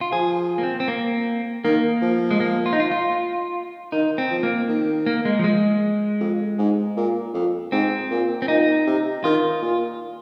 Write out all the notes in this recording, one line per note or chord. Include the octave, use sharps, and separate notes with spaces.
F4
F3 G#4
A#3
C4
C4
A#3
D#3 A#3
F3
G#3
A#3
F4
D#4
F4
F4
D#3 D#4
C4
F3
A#3
D#3
A#3
G#3
F3
G#3
F2
G#2
A#2
F2
G#2 C4
A#2
C4
A#2 D#4
C3
D#3 F4
A#2